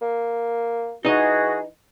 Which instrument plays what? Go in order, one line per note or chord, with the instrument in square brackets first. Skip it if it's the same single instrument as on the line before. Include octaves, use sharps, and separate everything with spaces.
[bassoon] A#3
[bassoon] E3 [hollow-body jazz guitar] D#4 D#5 [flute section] F#4 G#4